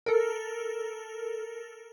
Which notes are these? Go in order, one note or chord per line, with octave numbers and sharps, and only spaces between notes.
A4 A#4